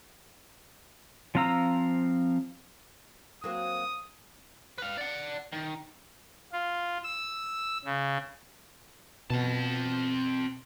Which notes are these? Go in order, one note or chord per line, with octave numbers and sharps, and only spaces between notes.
F3 C4 F5 A#5 E6
F#3 A#3 C4 D#6
B4 F5
D5 F#5
D#3
F4
E6
C#3
B2 C4 A5